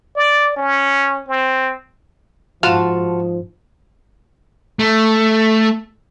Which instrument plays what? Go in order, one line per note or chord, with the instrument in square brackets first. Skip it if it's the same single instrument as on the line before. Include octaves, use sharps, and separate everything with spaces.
[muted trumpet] D5
C#4
C4
[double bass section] G#2 [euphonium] F3 [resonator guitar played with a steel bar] F4 F#4 A5 [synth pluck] F5
[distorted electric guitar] A3